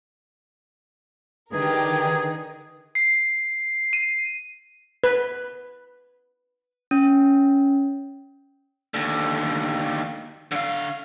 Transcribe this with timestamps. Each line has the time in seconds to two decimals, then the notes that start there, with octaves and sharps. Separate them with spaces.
1.53 D3 D#3 G4 G#4 A#4 B4
2.95 C7
3.93 D#7
5.04 B4
6.91 C#4
8.94 D#2 D3
10.52 D3 F5